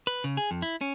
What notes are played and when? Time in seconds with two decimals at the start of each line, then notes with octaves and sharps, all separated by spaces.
0.07 B4
0.24 C#3
0.37 G#4
0.51 F2
0.62 E4
0.81 C#4